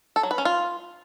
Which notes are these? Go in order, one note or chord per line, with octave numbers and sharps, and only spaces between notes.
A4
F#3
B4
C#4
F4